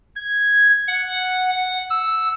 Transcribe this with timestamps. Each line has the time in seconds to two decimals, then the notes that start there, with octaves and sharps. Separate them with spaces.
0.15 G#6
0.88 F#5
1.90 E6